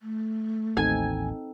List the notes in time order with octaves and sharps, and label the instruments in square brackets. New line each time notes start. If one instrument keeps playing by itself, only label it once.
[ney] A3
[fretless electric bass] A1 D#2 A2 [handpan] C4 D#4 A4 [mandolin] G#5